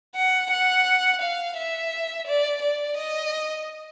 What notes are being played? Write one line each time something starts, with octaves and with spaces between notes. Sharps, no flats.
F#5
F#5
F5
E5
D5
D5
D#5